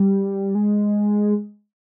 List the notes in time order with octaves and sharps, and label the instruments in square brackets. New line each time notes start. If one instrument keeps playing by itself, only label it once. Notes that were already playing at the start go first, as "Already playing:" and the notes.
Already playing: [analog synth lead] G3
G#3